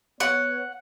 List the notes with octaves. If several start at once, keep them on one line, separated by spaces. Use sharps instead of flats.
B3 C#5 F#5